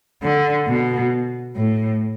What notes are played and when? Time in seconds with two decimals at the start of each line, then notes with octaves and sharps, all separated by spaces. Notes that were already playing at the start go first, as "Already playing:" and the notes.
0.23 D3
0.68 B2
1.56 A2